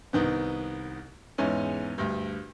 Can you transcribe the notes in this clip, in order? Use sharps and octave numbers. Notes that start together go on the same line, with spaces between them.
C2 D#3 B3
E2 G#2 E3 C#4
D2 G2